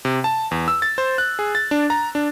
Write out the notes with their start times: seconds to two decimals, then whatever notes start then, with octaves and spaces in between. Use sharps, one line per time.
0.05 C3
0.24 A5
0.51 E2
0.68 E6
0.82 A6
0.98 C5
1.18 F#6
1.39 G#4
1.55 A6
1.71 D4
1.90 A#5
2.15 D4